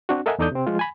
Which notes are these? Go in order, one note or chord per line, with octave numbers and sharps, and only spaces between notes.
C4 D4 F#4
A4 A#4 D#5 E5 F#5 G#5
E2 D#4 A4 D5 D#6 G6
C3 C4
F3 G#3 F4
G#5 B5